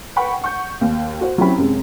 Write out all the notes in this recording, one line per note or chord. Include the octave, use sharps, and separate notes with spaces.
B4 F#5 G5 B5 C#6
F#5 C#6 G6
D#2
F#4 C5
F#3 C4 C#4 E4 G4 B5
F#2 C3 G#3